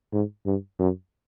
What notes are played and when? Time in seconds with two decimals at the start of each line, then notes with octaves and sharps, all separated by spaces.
0.13 G#2
0.46 G2
0.79 F#2